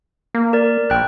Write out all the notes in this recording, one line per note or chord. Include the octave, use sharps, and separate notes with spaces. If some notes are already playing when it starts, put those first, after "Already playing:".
A#3
A#4 D5
A#1 G5 F#6